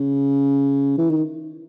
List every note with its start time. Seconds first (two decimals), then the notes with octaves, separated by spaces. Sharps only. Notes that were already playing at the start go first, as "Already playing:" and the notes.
Already playing: C#3
0.98 E3
1.10 D#3